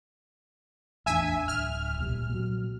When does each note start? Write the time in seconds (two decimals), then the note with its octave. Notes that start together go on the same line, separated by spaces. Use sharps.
1.06 A1 E2 D4 E5 G#5
1.48 D1 F6
1.98 C2 A#2 G3
2.29 A#2 F#3